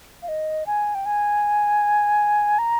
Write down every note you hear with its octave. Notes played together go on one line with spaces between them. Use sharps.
F5
D#5
G#5
G5
G#5
A#5